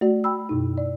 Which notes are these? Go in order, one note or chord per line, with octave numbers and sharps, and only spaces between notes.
A3 F#4 D5
G5 B5 E6
F#2 B2 D#4
D5